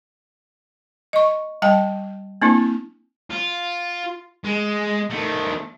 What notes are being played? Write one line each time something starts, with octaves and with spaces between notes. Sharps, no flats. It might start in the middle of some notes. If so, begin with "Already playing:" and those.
D#5 C#6
G3 D#5 G5 A5
A#3 C4 D4 E4
F4
G#3
D#3 A3